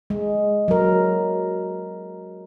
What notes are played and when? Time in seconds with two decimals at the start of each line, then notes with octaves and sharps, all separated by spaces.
0.10 G#3
0.68 F#3 A#4